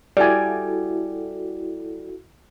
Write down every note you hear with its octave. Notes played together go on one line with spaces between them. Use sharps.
G3 E4 F#4 A4 D5 G#5